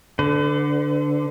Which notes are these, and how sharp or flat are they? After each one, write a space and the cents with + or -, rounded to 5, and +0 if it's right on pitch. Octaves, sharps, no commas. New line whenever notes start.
D3 +0 B4 +45